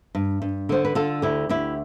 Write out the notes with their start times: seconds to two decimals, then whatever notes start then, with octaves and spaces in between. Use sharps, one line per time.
0.15 G2
0.42 G2
0.69 D3 C5
0.85 B4
0.95 D3 F4 A4
1.22 D2 E4 G4
1.49 D2 E4 G4